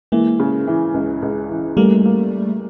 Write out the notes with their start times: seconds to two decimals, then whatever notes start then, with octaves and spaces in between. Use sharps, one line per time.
0.12 E3 G#3 A#3
0.40 C#3
0.68 E3
0.94 C#2
1.22 C#2
1.50 E3
1.77 G3 A3 A#3
2.05 A#3